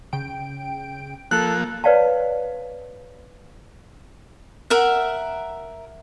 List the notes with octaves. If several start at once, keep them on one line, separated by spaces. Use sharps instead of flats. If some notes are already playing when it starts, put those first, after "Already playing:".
C#3 G5 D7
F3 A#3 A4 F#6
B4 C#5 D5 F5 G5 A5
A#4 E5 F#5